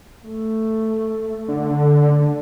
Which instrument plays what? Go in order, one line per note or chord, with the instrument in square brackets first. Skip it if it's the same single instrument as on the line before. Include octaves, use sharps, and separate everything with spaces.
[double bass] A3
[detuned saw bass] D3